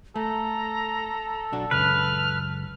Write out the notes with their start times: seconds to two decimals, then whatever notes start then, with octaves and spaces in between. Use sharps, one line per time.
0.16 A3 A4 A#5
1.52 B1 D4 F#4
1.71 C#2 F#2 B4 F6